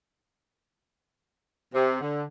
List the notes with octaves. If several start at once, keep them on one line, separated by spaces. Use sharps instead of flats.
C3
D3